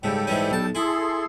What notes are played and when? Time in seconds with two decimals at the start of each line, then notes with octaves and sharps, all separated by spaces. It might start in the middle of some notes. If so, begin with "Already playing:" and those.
0.03 G#2 C#3 G3 A4 G5
0.27 G#2 E3 C#4
0.50 B1 A5
0.75 E4 G#4 A4 C6